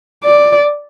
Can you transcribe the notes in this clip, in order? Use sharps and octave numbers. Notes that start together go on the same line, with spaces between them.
D5